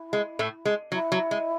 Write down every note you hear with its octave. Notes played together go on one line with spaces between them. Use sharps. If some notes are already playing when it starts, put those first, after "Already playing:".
Already playing: E4
G#3
A2 A3
G#3
F#3 E4
F#3
G#3